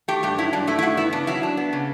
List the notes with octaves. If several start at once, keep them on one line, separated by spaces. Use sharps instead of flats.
A3 G4
G2 G4
F#3 E4
G2 D4
A3 E4
E4
G2 F#4
B3 E4
C#3 D4
F#3 E4
D4
B3
C#3